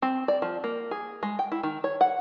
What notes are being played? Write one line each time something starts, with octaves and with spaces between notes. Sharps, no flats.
C4
D5
F3
A#3
G#4
G#3
G5
E4
D#3
C#5
F#5